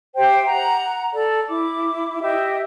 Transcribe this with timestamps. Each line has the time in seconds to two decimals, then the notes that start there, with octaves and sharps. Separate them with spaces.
0.16 G4 C5 E5 G5
0.46 F#5 A#5
1.13 A4 D5
1.48 E4 D6
2.21 G4 D#5 E5